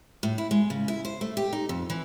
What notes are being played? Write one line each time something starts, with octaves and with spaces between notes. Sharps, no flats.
A2
E4
G#3
C#3
E4
C5
A3
G4
D#4
F2
E3